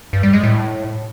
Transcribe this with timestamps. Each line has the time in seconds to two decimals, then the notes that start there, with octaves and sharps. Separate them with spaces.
0.13 G2
0.23 G3
0.33 G#3
0.43 A2